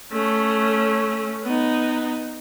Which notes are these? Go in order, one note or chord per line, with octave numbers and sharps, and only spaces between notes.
A3 C#4
B3 D#4